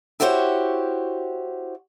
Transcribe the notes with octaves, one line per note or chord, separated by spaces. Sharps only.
E4 F#4 G4 C5 C#5 F#5